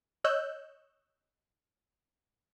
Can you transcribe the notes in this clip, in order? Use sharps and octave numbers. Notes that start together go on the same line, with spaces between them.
C#5 D#5 E6 F#6 G6